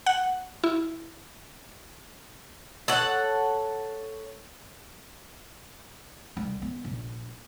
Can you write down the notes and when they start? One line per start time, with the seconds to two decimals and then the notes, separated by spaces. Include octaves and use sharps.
0.06 F#5
0.64 E4
2.88 A4 C#5 F#5
6.37 C2
6.62 B3
6.85 A#1